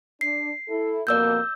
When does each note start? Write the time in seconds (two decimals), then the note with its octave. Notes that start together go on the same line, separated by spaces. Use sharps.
0.21 D4 C7
0.68 E4 A4
1.07 F2 B2 A#3 D5 E6 G6